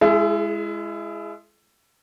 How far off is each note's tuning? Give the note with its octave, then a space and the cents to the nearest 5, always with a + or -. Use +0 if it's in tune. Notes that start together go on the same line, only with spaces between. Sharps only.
G#3 +0 E4 +30 G#4 +45